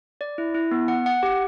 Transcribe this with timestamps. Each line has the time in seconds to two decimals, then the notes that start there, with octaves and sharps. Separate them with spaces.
0.21 D5
0.38 E4
0.54 E4
0.71 B3
0.88 F#5
1.06 F#5
1.23 G4